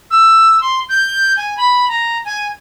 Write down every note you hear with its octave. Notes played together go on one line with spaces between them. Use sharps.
E6
C6
G6
G#5
B5
A#5
G#5